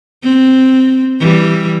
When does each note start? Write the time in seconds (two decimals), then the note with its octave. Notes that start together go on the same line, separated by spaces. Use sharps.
0.24 C4
1.20 E3 G3